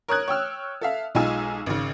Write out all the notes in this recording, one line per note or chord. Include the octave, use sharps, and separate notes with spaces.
A#4 C#5 D#6 F#6 G#6
C#5 G5 E6 F6
A4 E5 F5
B1 G#3 D#4 F4 G#5 E6
G#1 C#3